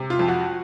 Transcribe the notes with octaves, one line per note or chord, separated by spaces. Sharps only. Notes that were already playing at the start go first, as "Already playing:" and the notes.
Already playing: C3
F4
F2
F#4